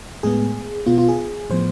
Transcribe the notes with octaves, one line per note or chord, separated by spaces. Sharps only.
A2 G#3 B3 G#4
B2 B3 F4
F4
G#4
A2 F3 B3 C5